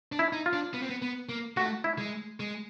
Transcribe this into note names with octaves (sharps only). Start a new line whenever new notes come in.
D4
E4
D#4
F4
D4
B3
C4
B3
B3
A#3
A3 F#4
E4
G#3
G#3